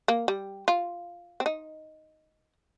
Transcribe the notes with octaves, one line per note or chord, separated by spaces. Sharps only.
A#3
G3
F4
C4
D#4